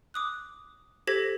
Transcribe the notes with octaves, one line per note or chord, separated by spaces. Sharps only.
D6 D#6 F#6
G4 A4 C5 G#6 A#6 B6